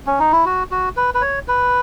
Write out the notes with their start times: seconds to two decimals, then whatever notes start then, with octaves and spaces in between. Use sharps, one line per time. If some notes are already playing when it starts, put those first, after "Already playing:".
0.07 C#4
0.19 D#4
0.32 E4
0.45 F#4
0.71 F#4
0.96 B4
1.14 B4
1.21 C#5
1.48 B4